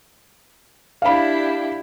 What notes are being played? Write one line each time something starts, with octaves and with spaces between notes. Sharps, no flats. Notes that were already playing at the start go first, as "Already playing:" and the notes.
D4 E4 G4 F5 B5